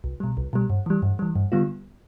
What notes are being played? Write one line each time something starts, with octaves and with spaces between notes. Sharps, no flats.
C2
B2 G3
C2
B2 G3
G2
E3 G3
G2
E3 G3
G2
D3 G3 B3 F4